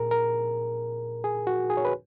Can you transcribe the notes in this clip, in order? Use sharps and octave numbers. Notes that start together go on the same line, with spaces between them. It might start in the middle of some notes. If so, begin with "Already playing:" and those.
Already playing: A#2 G#4 A#4
A#4
G#4
F#4
G#4
C#5
B4